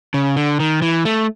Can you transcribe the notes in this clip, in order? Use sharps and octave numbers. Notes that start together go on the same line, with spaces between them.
C#3
D3
D#3
E3
A3